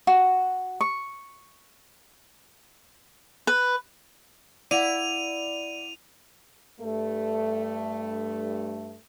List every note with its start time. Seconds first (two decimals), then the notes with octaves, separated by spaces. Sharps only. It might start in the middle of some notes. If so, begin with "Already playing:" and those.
0.07 F#4
0.81 C#6
3.47 B4
4.71 E4 D5 F5 F#5 D#7 F7
6.81 G2 A3